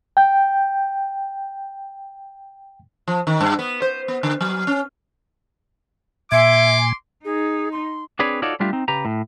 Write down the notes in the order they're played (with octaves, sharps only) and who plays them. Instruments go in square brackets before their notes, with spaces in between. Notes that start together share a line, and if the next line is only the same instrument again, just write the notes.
[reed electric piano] G5 G6
[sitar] F3
D#3
G2
B3
C5
B3
D3
F#3
C#4
[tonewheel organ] A#2 G#5 [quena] E5 [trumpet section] C6 D6
[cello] D#4 [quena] G#4
[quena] C6
[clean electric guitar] C4 D4 G#4 B4 C#5 D5
D#4 F4 F#4 A4 C#5 D5
G3 A3 D4 F4 G4
C4 D#4
C#3 G4 B4 A#5
A2